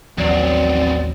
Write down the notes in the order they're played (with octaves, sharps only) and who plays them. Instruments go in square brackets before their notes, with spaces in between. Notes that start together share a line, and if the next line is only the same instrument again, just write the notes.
[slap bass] A1 D#2 F3 [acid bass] F#3 [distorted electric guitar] B3 C4 [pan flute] D5